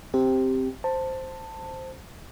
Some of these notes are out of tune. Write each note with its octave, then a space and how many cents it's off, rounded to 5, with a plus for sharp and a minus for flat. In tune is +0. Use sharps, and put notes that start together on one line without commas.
C4 +0 G4 +0
C5 +0 A5 +15